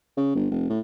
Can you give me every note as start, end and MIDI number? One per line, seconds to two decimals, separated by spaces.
0.17 0.34 49
0.35 0.48 31
0.51 0.68 29
0.69 0.80 45